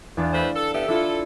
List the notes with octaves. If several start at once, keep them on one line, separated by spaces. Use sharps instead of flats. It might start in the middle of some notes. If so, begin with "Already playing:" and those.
E2 D4 F5
A3 B4 C5 F5
A4
B3 G4 A4 E5
D4 E4 F4 A4